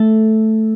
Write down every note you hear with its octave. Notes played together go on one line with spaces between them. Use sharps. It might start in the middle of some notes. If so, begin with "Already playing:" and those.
Already playing: A3 A4